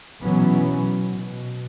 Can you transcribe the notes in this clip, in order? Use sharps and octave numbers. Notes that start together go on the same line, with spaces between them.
B2 E3 F#3 B3 C#4
B2